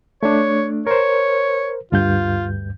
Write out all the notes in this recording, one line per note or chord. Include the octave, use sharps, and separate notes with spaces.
A3 D4 C#5
A#4 C5 C#5
D2 G2 F4 G6